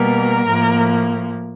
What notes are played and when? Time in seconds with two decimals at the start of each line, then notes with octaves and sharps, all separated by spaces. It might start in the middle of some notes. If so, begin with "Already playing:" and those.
Already playing: B2 G3 A#3 A#4
0.47 A2 F3 A#3